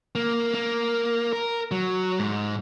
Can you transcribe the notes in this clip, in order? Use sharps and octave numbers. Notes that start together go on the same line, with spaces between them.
A#3
A#3
A#4
F#3
G#2